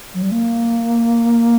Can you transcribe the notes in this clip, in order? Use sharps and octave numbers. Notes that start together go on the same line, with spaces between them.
F#3
G3
A#3